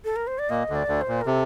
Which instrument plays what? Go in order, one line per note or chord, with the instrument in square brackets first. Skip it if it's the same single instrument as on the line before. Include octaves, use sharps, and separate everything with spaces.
[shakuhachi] A4
A#4
C5
D5
[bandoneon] A#2 A#3 [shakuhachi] D#5
[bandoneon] D2 D3
[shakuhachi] D5
[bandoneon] D2 D3
[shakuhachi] C5
[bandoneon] A#2
[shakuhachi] A#4
[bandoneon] C3 [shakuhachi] A4